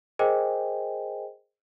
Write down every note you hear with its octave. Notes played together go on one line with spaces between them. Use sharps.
G#4 A#4 C5 D#5 G5 G#5